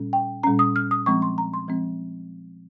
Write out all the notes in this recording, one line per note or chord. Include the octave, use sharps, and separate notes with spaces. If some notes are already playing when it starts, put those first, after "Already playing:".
Already playing: A#2 G3 C#4
G5
A#2 G3 C#4 A#5
D#6
F6
D#6
F3 G#3 C4 C#6
C6
A#5
C6
F3 G#3 C4